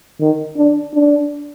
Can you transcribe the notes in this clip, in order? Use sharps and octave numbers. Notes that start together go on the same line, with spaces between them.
D#3
D4
D4